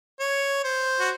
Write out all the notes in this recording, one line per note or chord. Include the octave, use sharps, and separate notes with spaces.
C#5
C5
F#4